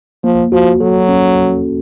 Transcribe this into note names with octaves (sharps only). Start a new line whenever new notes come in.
F3 A#3
F3 F#4
F#3 A4
C#4